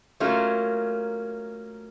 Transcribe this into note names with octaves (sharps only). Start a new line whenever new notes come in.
F#3 A3 A#3 C#4 F4